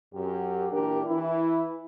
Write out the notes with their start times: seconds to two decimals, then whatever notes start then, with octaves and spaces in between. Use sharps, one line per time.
0.14 F#2 G4
0.71 A#2 E3 D4 G4 A#4
1.06 E3 E4